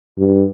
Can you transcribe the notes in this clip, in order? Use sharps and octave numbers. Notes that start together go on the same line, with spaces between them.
G2